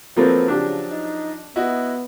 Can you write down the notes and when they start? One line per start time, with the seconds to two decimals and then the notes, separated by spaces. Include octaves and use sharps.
0.17 F3 F#3 A3 A#3 C4 B4
0.48 C#3 D4 G4
0.91 D#4
1.56 B3 E4 F#4 D#5